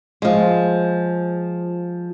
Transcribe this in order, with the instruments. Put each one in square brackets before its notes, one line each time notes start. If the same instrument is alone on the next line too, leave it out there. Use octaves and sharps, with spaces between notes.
[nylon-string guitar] F3 G#3